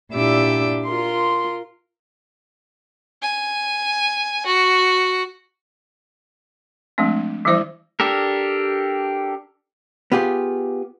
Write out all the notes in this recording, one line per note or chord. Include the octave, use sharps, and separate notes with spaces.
A#2 D4 E4 G4 D6 E6
F4 A#4 C6
G#5
F#4
F3 G#3 A3 C4 D4
E3 F3 G3 E4 C5 E5
D4 G4 A4 A#4
B3 F4 G4 G#4